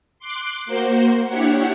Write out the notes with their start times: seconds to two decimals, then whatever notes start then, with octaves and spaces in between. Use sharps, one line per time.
0.19 C6 D6 F#6
0.66 A#3 F#4 C5
1.27 D4 E4 G4 C#5 F#5